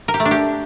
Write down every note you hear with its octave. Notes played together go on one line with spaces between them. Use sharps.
A#4
G4
A3
D4
G4